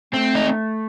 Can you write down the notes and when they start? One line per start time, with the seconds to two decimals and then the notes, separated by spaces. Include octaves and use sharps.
0.14 A3 C4
0.35 D#4